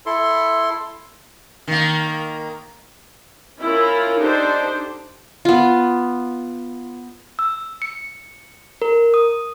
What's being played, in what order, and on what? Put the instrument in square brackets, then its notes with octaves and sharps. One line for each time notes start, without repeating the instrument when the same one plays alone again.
[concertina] E4 A4 C6
[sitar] D#3 A#3
[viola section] C#4 E4 F4 A#4
D4 D#4 G4 A4 C5
[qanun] B3 F4
[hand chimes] E6
C#7
A#4
D#6